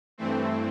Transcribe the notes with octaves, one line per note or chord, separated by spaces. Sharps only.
G2 E3 A3 C4